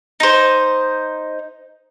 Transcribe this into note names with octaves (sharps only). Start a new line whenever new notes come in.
D#4 C5